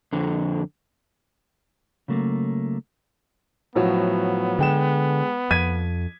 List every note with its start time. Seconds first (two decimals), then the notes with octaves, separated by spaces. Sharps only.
0.13 F2 D3
2.08 C#3 F#3 A3 A#3
3.75 A2 F3 F#3 B3
4.59 D3 G#3 G5 E7
5.51 F2 G#6 B6 D#7